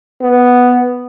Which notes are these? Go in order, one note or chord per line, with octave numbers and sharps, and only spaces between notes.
B3